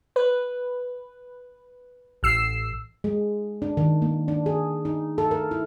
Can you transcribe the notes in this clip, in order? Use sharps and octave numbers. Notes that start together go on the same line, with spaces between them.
B4
A1 E6 C7
G#3
D4
D#3
A#3
D4
G#4
D#4
A4
A#4
E4